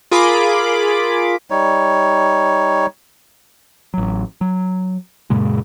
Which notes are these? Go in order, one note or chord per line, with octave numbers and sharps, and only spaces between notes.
F4 G#4 A#4 B5 D6
G3 D#4 C#5
A1 F#3
F#3
F#2 A#2 C#3 G#3